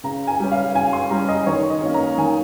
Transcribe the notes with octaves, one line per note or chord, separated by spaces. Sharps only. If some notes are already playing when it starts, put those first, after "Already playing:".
C#3 A#5
G#5
G3 C#4
F5
C#3 G#5
C6
G3 C#4 A#5
D#5
D#3 C#5
D#5
A#3 C#4
A#5
D#3 G#5